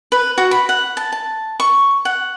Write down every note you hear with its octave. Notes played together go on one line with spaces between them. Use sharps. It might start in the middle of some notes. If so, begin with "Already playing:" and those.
B4
F#4
B5
F#5
A5
A5
C#6
F#5